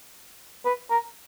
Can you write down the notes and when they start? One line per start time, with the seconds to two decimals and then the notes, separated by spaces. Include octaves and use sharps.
0.65 B4
0.91 A#4